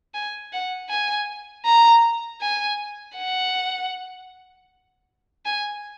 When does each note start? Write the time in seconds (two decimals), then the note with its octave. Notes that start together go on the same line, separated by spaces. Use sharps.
0.14 G#5
0.53 F#5
0.90 G#5
1.65 A#5
2.41 G#5
3.18 F#5
5.45 G#5